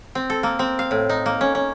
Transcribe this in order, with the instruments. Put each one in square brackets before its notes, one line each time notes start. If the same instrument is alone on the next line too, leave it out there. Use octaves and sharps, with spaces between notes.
[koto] C4
A4
A#3
C4
F5
A2
D#4
A#3
C#4
C#4